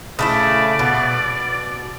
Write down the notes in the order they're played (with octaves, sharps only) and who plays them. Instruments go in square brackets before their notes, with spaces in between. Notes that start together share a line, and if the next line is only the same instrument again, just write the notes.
[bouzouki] C#3 A3 E4 [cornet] D5
[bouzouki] B2